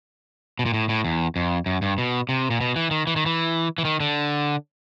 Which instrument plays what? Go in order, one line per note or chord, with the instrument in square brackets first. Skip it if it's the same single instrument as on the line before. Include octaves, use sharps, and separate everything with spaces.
[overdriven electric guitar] B2
A#2
A2
A2
E2
F2
F#2
G2
B2
C3
A#2
B2
E3
D#3
E3
D#3
E3
E3
D#3
D3